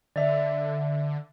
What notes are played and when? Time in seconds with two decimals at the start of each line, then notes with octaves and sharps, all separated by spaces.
0.16 D3 D5 E5